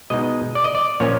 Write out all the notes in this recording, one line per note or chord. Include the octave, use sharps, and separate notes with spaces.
B2 G#3 B3 D#4 D#5
D5
D#5
D5
A#2 F3 A#3 C#4 C#5